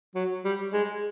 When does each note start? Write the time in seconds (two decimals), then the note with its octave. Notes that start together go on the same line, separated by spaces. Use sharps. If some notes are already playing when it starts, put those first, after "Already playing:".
0.15 F#3
0.45 G3
0.73 G#3